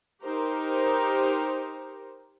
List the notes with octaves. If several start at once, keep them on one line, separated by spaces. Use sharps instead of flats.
D#4 G4 A#4 C5